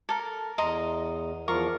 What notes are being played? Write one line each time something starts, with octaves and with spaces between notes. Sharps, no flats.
A4 A#4
E2 D#5 A#5 C6
E2 F3 F4 A#4 A#5 C#6